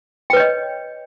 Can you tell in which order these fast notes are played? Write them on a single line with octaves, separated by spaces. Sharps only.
G5 B4 C#5 D#5